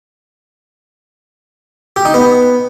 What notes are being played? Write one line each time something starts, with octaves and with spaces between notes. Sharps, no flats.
G4
D#4
B3